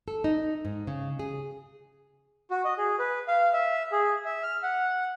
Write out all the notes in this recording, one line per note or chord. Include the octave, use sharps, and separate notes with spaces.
A4
D#4
G#2
C#3
G#4
F#4
D#5
G#4
B4
F5
E5
G#4
E5
F6
F#5